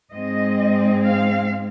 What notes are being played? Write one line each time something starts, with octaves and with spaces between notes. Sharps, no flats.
G#2 G#3 C4 D#5
F5